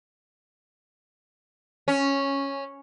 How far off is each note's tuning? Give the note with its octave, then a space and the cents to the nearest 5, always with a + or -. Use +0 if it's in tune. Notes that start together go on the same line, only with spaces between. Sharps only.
C#4 -5